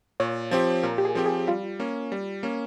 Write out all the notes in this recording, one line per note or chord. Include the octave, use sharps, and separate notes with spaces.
A#2 C#5
F3 C4 G4
A#2 A#4
G4
G#4
F3 C4 G4
G#4
G3 F4
A#3 C#4
G3
A#3 C#4